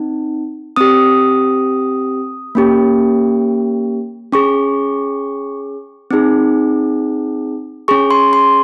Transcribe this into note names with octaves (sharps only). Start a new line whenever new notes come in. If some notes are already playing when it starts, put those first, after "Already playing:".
Already playing: C4 D#4
C4 G4 D#6
A#3 C#4 G4
C#4 G#4 C#6
C4 D#4 G#4
C#4 G#4 C#6
C6
C6